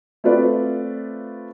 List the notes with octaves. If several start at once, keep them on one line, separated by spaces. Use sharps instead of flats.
A3 C4 F4 B4 D5